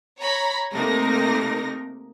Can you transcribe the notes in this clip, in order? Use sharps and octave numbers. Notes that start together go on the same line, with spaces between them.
C#5 A#5 B5
C3 A3 A#3 D#4 A#4 A#6